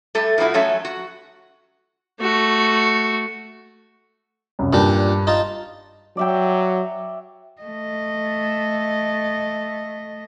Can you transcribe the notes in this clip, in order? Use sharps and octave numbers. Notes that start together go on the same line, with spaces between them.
G3 A3 A4
A2 F3 A3 C4 E4 F#4
F3 F#3 A3 C#4 A4 E5
F#4
A3 F#4
C2 F#2
G2 A#2 D4 G4
D#4 F4 A5
F#3 D5 E5 G5
A3 D#5